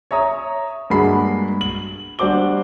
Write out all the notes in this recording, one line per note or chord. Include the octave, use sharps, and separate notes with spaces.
C#5 E5 A#5 D#6
G2 G#3 A#3 F#4 B5 C7
F#7
G3 D4 F#4 C5 D6 G7